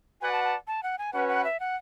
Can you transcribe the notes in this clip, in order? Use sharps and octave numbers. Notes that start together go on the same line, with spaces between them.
F#4 B4 D5 F#5 G#5
A5
A5
A5
F#5
G#5
C#4 F#4 B4 F#5
F#5
E5
F#5